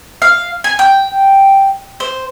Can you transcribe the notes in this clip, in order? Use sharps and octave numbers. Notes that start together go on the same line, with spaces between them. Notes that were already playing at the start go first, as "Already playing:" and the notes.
F5
G#5
G5
C5